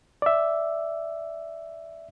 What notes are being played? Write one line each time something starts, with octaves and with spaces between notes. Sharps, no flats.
D5 E5